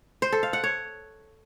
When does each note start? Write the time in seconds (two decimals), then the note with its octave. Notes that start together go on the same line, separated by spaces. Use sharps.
0.22 C5
0.32 A4
0.43 F5
0.53 F#5
0.64 C#5